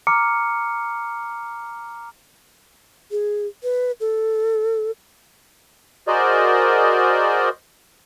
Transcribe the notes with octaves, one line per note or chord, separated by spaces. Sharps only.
A#5 D6 F6 C#7
G#4
B4
A4
F#4 G#4 A#4 C5 D5 D#5